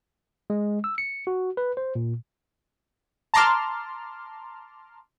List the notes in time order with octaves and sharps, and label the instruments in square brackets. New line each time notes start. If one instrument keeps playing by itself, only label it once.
[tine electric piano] G#3
E6
C#7
F#4
B4
C5
A#2
[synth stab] A5 A#5 C6 D6 F6